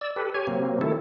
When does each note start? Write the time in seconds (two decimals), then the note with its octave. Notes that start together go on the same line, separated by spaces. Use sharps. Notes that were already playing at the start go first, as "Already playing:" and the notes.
0.01 D5 E6
0.16 G4 A4 B4
0.34 G4 C#5 G#5
0.47 C3 F#3 A#3 C4
0.81 D#3 A3 E4 A4